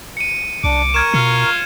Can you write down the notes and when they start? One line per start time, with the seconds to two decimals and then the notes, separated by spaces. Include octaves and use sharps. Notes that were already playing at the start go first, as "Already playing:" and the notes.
0.17 C#7 D#7
0.64 C2 D4 D6
0.94 A#4 C#6 F6 G#6 E7
1.14 B2 F4 C#7